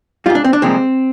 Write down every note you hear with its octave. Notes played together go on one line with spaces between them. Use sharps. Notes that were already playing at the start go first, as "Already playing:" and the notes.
G3 F4
G#2
D4
C4
D4
C2 A#2 F3 G#3 C4